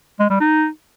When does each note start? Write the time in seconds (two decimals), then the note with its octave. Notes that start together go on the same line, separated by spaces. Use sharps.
0.20 G#3
0.30 G3
0.40 D#4